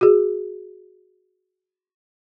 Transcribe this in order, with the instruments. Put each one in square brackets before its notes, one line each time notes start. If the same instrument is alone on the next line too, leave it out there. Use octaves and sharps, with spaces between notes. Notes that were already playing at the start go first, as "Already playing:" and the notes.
[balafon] F#4 G#4